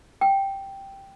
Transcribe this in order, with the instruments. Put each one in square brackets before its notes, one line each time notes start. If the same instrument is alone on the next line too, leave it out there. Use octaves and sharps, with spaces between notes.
[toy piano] G5